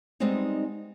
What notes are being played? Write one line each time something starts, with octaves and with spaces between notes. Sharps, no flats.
G3 G#3 B3 C4 D#4